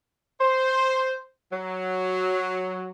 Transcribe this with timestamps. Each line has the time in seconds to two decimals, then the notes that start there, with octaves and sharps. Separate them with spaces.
0.40 C5
1.53 F#3